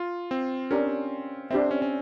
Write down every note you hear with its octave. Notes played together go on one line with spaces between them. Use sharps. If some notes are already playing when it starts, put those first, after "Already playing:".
Already playing: F4
C4
C#4 D4 G4 A#4
C4 D4 G4 C5 E5
C#4
C#4